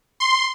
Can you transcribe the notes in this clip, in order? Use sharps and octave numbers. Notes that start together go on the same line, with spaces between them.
C6